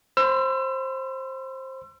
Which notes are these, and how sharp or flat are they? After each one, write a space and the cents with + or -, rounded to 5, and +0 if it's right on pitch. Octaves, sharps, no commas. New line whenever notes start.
C5 +15 B5 +45 E6 +35